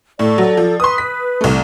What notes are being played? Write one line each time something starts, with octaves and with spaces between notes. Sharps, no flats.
A2 A4 D5
F#3
F3
B4 C6 D#6
B6
C2 A3